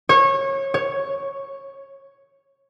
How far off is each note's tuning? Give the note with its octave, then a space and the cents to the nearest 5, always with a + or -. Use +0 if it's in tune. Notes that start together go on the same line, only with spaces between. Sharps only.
C#5 -25
C#5 +0